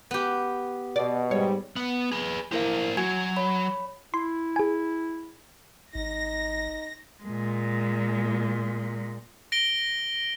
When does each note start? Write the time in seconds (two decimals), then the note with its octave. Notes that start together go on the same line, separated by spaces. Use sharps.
0.11 B3 G4
0.96 B2 D5
1.31 G#2 G3 C#5
1.76 B3
2.12 G#4 B4
2.52 A#3 E4 A#4 C5 F5
2.97 F#3 F#4 G#5 G#6
3.36 C#5 B5
4.14 E4 C6
4.56 G#4 G#5
5.95 G#1 D#4 A#6
7.24 A#2 G#3
9.52 A#6 D7 G7